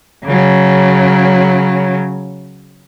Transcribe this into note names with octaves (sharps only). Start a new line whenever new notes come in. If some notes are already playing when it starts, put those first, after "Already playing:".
C#3 F#3